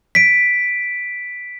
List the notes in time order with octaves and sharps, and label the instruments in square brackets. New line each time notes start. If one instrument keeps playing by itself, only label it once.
[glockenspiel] B6 D7